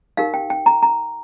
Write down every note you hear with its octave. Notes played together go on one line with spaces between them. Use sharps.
D#4 G4 A#4 F5
G5
G5
A#5
A#5